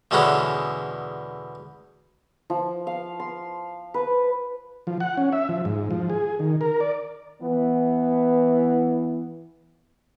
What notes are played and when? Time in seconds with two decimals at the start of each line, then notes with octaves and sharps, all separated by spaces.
0.11 E2 B2 D3 G#3 B3 C#4
2.50 F3
2.87 F5
3.20 C6
3.94 B4
4.87 F3
5.00 F#5
5.17 C#4
5.33 E5
5.49 F3
5.65 G#2
5.91 F3
6.10 G#4
6.39 D#3
6.61 A#4
6.80 D5
7.42 E3 B3